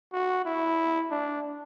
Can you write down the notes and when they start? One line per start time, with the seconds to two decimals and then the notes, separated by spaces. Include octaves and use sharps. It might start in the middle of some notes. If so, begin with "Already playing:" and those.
0.13 F#4
0.45 E4
1.11 D4